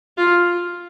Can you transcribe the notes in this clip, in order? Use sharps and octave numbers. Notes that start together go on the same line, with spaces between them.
F4